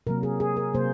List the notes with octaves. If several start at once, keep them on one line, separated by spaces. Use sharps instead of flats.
C3 F#3 A#3 A#4
G#4
G#4
A#4
C3 F#3 A#3 C5